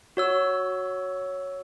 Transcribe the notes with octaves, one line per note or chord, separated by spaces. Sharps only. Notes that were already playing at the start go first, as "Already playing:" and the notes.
F#4 C#5 E6